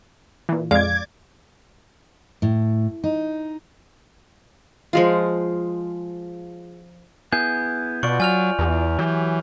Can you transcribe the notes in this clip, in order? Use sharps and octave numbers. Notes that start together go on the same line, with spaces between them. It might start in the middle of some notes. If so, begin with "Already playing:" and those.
A#2 E3
F2 G#3 D5 F5 G#6
A2
D#4
F3 G#3 F4
B3 E4 G#4 G6
B2 F4 D5 F#5 C#6
F#3 G#5 F6 F7
E2
E3 F#3 G4